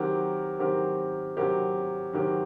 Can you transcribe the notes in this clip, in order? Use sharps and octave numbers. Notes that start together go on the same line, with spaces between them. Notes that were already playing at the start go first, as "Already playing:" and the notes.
Already playing: D#3 F#3 C4 G4 A#4
D#3 F#3 C4 G4 A#4
D#3 F#3 C4 G4 A#4
D#3 F#3 C4 G4 A#4